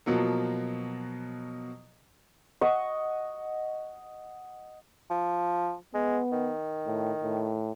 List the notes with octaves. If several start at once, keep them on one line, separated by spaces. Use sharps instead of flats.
B2 F3 F#3 A#3
D#5 F#5 C#6
F3
G#3 B3
D#3
A2
A2